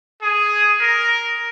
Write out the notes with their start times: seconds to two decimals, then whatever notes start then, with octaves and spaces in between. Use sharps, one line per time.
0.22 G#4
0.81 A#4